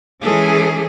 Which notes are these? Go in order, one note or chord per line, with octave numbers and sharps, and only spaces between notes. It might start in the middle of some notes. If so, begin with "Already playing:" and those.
E3 G#3 C#4 G#4 A4